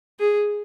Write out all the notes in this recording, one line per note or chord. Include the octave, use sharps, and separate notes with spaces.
G#4